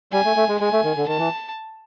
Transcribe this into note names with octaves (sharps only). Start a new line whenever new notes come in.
G3 G#5
A3
A3
G#3
G#3 G#5
A3
D#3
D3
D#3 A5
E3